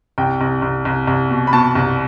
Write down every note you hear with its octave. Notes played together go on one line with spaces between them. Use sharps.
C2 G5
C2
C2
C2
C2
B2
B5
B2 A5
C2